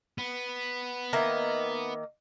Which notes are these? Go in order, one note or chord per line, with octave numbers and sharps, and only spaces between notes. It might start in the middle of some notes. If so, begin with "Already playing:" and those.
B3
D#3 A#3 E5